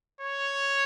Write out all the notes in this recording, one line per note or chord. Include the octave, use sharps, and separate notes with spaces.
C#5